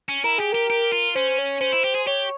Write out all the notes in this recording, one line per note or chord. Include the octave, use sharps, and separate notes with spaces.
C#4
E4 A#4
G4 G#4
G4 A#4
G4
F4
C#4 C5
C#5
C#4 C5
E4
G4
G#4
G4 C#5